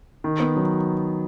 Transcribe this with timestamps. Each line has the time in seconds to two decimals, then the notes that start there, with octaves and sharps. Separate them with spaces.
0.24 D#3
0.40 B3
0.56 F#3